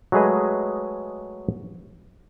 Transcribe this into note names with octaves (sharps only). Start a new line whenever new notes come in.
F#3 G#3 A3 G#4 B4 D#5